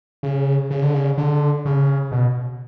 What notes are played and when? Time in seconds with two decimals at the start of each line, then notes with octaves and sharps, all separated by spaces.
0.23 C#3
0.70 C#3
0.82 D3
0.94 C#3
1.17 D3
1.65 C#3
2.12 B2